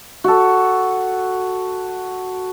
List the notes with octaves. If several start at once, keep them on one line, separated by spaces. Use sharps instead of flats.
F#4 A4